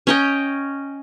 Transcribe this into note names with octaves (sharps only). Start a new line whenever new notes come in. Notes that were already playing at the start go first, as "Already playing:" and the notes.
C#4 D#5 G5